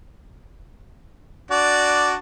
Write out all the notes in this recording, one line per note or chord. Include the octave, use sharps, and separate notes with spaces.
D4 F#4 D5